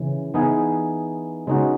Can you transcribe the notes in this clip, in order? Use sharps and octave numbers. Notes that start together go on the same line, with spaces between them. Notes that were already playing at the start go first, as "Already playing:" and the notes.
Already playing: C#3 E3
E3 B3 D#4 G#4
C#3 G#3 B3 D#4 F#4